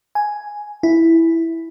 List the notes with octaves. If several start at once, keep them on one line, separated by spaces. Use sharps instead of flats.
G#5
E4